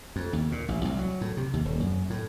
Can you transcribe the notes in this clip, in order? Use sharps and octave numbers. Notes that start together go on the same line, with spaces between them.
F2
D#2
A#2
A1
C2
F#3
A2
C3
D#2
D#1
F#2
A2